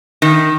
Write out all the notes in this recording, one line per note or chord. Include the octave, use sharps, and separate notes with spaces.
D#3